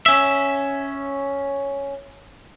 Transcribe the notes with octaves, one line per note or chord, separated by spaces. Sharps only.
C#4 E5